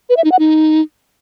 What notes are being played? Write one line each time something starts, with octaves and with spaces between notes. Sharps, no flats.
B4
E5
D#4
F#5
D#4